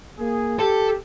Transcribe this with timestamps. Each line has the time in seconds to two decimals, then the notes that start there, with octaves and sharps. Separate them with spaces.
0.19 A#3 G#4
0.59 G4 A4